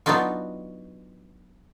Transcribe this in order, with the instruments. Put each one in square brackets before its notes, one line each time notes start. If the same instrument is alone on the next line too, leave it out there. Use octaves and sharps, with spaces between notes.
[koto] F#3 B3 D4 D#4 F4 F#4